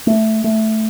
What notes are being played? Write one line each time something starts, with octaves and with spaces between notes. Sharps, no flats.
A3
A3